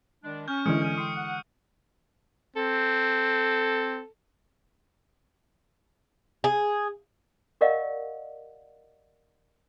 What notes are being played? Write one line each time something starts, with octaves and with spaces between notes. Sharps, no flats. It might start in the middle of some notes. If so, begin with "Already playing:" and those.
D#3 G#3 D4
C#4 C#6 F6 G6
D3 E3 G#3 D#6 C#7 D7
G6 D#7
G5 C6 C#6 D#6
F#5
C4 A4
G#4
G4 A#4 D5 D#5 F5 F#5